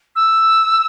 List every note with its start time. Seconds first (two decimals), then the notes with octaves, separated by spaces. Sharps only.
0.15 E6